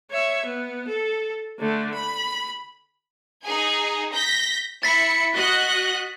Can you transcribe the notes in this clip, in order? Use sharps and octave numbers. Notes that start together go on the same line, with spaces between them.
C#5 E5
B3
A4
D3 A3
B5
D#4 G#4 G#5
G6 A#6 B6
E4 A6 B6 C#7
F#4 D#5 F#6